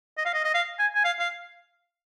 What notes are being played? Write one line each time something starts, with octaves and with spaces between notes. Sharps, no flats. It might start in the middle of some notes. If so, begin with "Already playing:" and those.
D#5
F5
D#5
D#5
F5
G#5
G#5
F5
F5